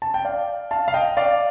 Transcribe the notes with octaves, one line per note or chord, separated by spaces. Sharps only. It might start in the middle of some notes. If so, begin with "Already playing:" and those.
A5
G5
D5 F5
F5 A5
F5
D#5 G5
D5 F5